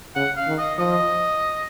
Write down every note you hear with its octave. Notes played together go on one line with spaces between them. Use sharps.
C#3 F#5
F5
D#3
D#5
F3 D#5